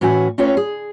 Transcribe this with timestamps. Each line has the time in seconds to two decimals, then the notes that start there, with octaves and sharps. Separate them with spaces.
0.01 A2 E3 C#4 F#4 E5 G#5
0.38 A3 C4 C#4 F4 B4 C#5
0.57 G#4